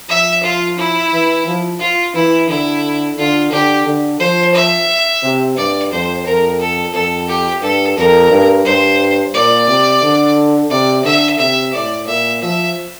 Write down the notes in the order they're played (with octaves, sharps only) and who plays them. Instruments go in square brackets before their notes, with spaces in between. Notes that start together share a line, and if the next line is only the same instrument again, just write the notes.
[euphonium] F3 [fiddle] E5
[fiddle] F4
E4
[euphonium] E3
F3
[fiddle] F4
[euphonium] E3 [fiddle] E4
[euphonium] D3 [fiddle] E4
[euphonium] D3 [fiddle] F4
[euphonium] D3 [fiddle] G4
[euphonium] D3
[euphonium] F3 [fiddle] C5
[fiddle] E5
[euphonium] C3
[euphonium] G2 [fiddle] D5
[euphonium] F2 [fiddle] C5
[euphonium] F2 [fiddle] A#4
[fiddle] A4
[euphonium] F2 [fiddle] A4
[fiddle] G4
[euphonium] G2 [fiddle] A4
[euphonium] F2 [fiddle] A#4
[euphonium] G2
[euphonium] G2 [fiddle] C5
[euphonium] A#2 [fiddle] D5
[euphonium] C3
D3
[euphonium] C3 [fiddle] D5
[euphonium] D3 [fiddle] E5
[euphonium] C3 [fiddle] E5
[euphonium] A2 [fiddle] D5
[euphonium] A#2 [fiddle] E5
[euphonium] F3 [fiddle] E5